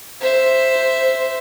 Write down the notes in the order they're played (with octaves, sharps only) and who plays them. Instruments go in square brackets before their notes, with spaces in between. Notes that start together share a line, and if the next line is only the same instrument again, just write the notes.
[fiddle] C5 E5